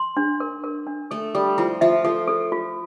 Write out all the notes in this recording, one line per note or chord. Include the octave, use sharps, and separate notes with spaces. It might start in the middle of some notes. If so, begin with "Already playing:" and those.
Already playing: C6
D4
A#4
A#4
D4
A3 A4
G3 A4
F3 E4
F3 E5
F3 A4
A4
F4